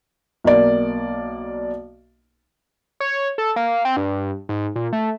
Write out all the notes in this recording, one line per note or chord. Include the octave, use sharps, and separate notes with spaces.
B1 A#3 D5
C#5
A4
A#3
C4
G2
G#2
A#2
A3